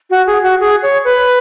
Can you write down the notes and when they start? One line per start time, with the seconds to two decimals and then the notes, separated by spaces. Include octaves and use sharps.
0.10 F#4
0.27 G#4
0.43 F#4
0.60 G#4
0.83 C#5
1.05 B4